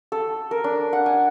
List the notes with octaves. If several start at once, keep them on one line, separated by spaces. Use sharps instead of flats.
A4
A#4
D4
F#5
G#5